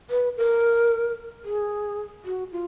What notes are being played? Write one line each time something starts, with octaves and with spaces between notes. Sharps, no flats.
B4
A#4
G#4
F#4
F4